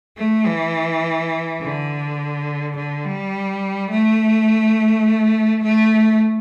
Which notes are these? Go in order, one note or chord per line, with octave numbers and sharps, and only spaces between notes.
A3
E3
D3
D3
G3
A3
A3